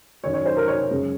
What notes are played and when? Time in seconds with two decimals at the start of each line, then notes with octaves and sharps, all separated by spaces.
0.23 F#2 D#3 F#3 C#5
0.34 C#5
0.45 C5
0.57 A#4
0.68 C#5
0.79 C#5
0.91 F#2 C#3 G#3